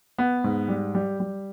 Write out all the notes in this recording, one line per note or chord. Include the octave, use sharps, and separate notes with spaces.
B3
G#2
G3
G3
G3